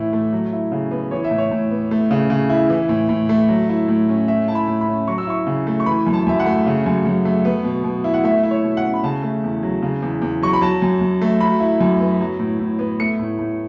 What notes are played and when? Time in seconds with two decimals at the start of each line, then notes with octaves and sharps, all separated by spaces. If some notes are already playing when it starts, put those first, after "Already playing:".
Already playing: A2 E3 E4
0.13 A3
0.32 F#3
0.53 E4
0.72 C#3
0.91 B3
1.11 E3 C#5
1.24 E5
1.31 A2
1.38 C#5
1.51 A2
1.71 B3
1.91 A3
2.11 C#3
2.30 C#3
2.50 E4
2.70 E3
2.89 A2
3.09 A2
3.29 A3
3.49 F#3
3.69 E4
3.88 A2
4.09 C#4
4.28 A3 E5
4.48 E4 A5
4.55 B5
4.68 A2
4.81 B5
4.87 C#4
5.07 F#3 C#6
5.18 E6
5.27 E4 C#6
5.47 C#3
5.67 A3
5.80 C#6
5.86 E3 B5
6.07 F#2
6.13 A5
6.27 F#2 E5
6.40 F#5
6.46 A3
6.66 C#3
6.86 F#2
7.06 F#2
7.25 A3
7.45 B3
7.64 B2
7.84 B2
8.04 E4
8.14 F#5
8.24 A3 E5
8.43 E4
8.51 C#5
8.63 B2
8.77 F#5
8.83 C#4
8.94 B5
9.04 C#3 A5
9.23 A3
9.44 E2
9.63 F#3
9.82 C#3
10.02 E2
10.22 E2
10.43 F#3 C#6
10.53 B5
10.61 F#3 A5
10.82 F#2
11.01 F#2
11.21 A3
11.40 F#3 B5
11.60 E4
11.81 F#2
12.00 B3
12.21 F#3
12.39 A2
12.59 A2
12.79 B3
13.00 A3 C#7
13.19 A2
13.39 A2